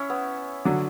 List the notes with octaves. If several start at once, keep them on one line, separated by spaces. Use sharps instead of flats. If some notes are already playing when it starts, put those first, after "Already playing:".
Already playing: C#4 E4 C#5
B3
D3 F#3